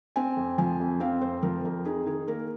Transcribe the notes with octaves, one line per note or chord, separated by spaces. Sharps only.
C4 G#5
F2
F3 G#5
F2
C4 F5
F2 C5
F3 A#4
F2 A#4
D#4 G#4
D#3 G#4
A#3 A#4